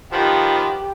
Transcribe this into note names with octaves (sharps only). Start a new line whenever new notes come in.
D#3 F3 B3 G4